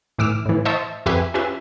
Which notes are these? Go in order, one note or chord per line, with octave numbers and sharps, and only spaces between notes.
A2 E3 D6 E6 F6
A2 E3
C5 D#5 E5 A5 C#6 D#6
F2 G4 B4 E5 G#5
C#4 F4 G4 B4 E5